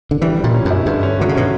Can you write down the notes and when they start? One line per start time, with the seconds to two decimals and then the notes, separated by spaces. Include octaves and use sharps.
0.11 D3
0.22 E3 G3
0.38 G3
0.44 A#2
0.54 C#4
0.65 F#2
0.70 E4
0.86 G2 D3
1.03 C#4
1.19 D3 F#3
1.29 C#3
1.35 B2 C#4